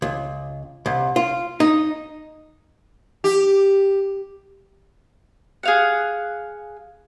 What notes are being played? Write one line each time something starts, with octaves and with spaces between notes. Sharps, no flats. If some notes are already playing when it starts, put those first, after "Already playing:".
C#2
C2
F4
D#4
G4
G#4 F5 F#5